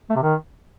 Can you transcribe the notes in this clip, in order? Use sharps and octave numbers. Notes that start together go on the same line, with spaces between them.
A3
C3
D#3